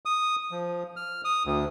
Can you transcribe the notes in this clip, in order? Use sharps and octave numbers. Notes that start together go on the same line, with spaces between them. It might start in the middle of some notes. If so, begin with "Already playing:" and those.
D#6
F3
F6
D#6
D2